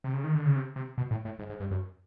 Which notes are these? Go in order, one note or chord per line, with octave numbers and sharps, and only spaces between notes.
C3
C#3
D#3
D3
C#3
C3
C3
B2
A2
A2
G#2
G#2
G2
F#2